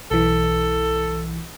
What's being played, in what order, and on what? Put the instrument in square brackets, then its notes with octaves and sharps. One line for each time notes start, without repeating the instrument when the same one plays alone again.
[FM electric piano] B1 E3 [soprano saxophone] A4